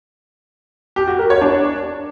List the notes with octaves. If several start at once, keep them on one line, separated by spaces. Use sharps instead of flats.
G4
F#4
A#4
C#5
D4